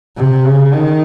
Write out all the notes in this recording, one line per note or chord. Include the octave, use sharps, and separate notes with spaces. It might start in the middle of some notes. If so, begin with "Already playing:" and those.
C3
C#3
D#3